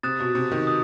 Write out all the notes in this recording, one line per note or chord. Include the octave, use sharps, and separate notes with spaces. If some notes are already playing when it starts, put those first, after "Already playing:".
C3 D#6 F#6 A6 E7
B2
C3
D#3
D#6 F#6